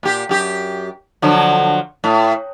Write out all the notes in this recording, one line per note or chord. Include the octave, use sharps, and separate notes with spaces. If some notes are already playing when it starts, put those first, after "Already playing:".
A#2 G4
F#2 G4
D3 F3 F#3
A2